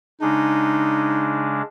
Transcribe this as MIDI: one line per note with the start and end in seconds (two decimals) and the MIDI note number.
0.21 1.62 49
0.21 1.62 56
0.21 1.62 62
0.21 1.65 63